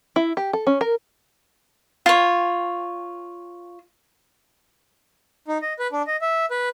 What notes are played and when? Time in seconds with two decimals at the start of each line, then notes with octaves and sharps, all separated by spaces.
0.16 E4
0.37 G4
0.53 A4
0.67 C#4
0.81 A#4
2.06 F4 C#5
5.48 D#4
5.62 D#5
5.79 B4
5.92 D4
6.07 D#5
6.22 E5
6.51 B4